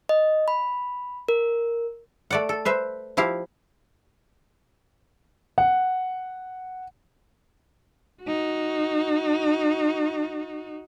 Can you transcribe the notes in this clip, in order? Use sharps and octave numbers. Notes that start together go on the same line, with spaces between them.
D#5
B5
A#4
A3 D5 F#5
A4
B4 C5 E5
F3 E4 G4 F5
F#5
D#4 F#4